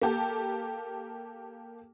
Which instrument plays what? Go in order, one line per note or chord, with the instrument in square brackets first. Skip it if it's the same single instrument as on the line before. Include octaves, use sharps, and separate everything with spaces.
[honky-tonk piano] A#3 G4 A4